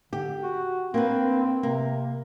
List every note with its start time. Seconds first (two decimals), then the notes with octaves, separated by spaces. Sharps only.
0.13 D3 G4
0.43 F#4
0.94 A#3 C4 D4 B4
1.44 C4
1.63 C3 A#3